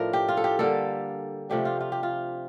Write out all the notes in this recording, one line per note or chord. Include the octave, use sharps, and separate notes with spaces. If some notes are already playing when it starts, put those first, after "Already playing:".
Already playing: A2 F3 A3 D4 A#4
G4
F4
A4
G4
D3 G3 A#3 A4
C3 F3 A3 D4 G4
F4
F4
G4
F4